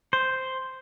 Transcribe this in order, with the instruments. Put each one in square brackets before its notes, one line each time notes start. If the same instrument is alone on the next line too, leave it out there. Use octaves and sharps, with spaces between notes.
[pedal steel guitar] C5